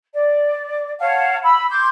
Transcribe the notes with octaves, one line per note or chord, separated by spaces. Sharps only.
D5
C#5 F5 F#5 A5
B5 E6
C6 D6 G6